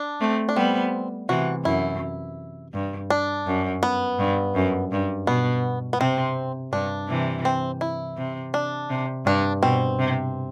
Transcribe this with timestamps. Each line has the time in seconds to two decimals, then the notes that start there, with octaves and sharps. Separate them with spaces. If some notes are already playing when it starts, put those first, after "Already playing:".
Already playing: D4
0.20 A3 C4
0.49 D4
0.56 G3 B3 C4
1.29 C3 E3 F#4
1.65 F#2 E4
2.74 G2
3.10 D4
3.47 F#2
3.83 B3
4.19 G2
4.55 F#2
4.92 G2
5.27 B2 B3
5.93 B3
6.00 C3 C4
6.73 G2 D4
7.08 C3 E3
7.45 C4
7.81 E4
8.18 C3
8.54 D4
8.90 C3
9.26 G2 D4
9.63 B2 C4
9.99 C3